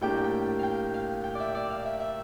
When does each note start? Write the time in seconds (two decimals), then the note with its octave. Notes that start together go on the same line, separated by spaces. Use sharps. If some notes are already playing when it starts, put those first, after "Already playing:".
0.01 A2 G3 A#3 D4 G4 G5
0.24 G5
0.59 F5 G5
0.94 F5
1.24 G5
1.35 D5
1.40 E5
1.55 D5
1.70 F5
1.86 E5
2.00 E5